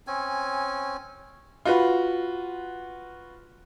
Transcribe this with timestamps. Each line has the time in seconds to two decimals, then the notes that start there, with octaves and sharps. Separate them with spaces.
0.07 C4 C#4 G#5
1.65 F4 F#4 B4